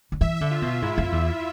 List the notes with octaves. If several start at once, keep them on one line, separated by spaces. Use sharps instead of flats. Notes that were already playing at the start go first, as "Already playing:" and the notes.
D3
E3 E5
D3 E5
F4
B2 F4
G#2 E4
F2
E2